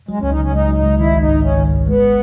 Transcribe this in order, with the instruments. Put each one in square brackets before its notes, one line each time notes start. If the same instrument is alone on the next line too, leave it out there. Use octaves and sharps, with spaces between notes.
[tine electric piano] F#3 [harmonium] G#3
[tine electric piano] C#2 [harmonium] C#4
[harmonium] D#4
[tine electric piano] C#3 [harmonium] C#4
[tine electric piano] C#2 [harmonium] D#4
[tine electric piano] F#3
[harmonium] D#4
[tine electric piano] C#2
[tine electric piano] D#3 [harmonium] E4
[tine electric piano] G#1
[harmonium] D#4
[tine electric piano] G#2
[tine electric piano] G#1 [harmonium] C#4
[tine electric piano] D#3
G#1
[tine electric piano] G#3 [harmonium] B3